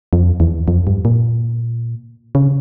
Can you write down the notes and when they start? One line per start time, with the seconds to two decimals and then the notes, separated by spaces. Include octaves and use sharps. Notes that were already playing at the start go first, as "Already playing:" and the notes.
0.13 F2
0.40 E2
0.68 F2
0.87 G2
1.05 A#2
2.35 C#3